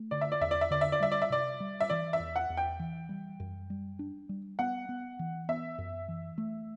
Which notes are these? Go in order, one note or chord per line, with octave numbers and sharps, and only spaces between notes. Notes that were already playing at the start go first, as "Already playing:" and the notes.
Already playing: A3
D3 D5
E5
D5
E2 E5
D5
E5
D3 D5
E5
D5
G3 E5
D5
E5
C3 D5
G3
E5
E3 D5
E5
E2
F#5
E2
G5
E3
G3
F#2
G3
D4
G3
B3 F#5
B3
E3
B3 E5
F#2
E3
A3